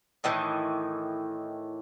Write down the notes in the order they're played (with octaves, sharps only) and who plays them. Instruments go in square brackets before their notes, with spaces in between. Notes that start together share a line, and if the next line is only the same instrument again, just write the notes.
[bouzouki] A2 D#3 E3